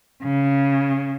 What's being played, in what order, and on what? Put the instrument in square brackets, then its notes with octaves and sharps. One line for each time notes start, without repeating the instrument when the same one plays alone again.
[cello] C#3